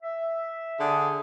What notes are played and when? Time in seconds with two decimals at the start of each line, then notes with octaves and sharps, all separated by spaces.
0.03 E5
0.80 D3 G#4